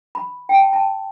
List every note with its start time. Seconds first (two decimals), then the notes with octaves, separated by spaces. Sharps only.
0.15 B5
0.49 G5
0.54 A5
0.73 A5